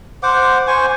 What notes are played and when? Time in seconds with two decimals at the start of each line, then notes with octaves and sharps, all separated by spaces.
0.23 C5 F#5 D6
0.68 C5 G#5 C#6